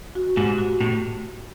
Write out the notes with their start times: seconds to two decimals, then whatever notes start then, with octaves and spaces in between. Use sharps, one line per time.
0.15 F#4
0.37 G#2 G4
0.58 F#4
0.81 A2